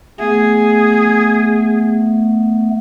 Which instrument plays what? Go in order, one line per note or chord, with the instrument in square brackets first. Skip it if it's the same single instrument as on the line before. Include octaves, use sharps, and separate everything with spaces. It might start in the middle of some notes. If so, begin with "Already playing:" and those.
[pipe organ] A3 B3 [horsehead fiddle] G#4